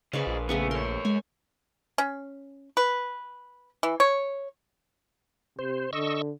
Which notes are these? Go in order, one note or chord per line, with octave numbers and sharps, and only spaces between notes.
C#3 G#4 B4 C5 D#5 F5
A#1
C#3 A3 B3 C#4
A#4 C#5 C6
G#3 G#5
C#4
B4
E3
C#5
C3 C5
D3 D#5 C#6 E6